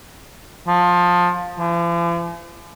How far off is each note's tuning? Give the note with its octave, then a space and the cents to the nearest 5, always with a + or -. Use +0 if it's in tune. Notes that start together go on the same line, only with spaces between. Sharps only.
F3 +20
F3 -45